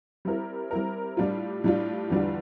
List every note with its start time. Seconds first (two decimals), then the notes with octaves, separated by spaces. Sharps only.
0.25 G3 C4 E4 A#4
0.71 G3 C4 E4 A#4
1.17 A2 G3 D4 F4
1.64 A2 G3 D4 F4
2.10 E2 D3 G3 D4 F4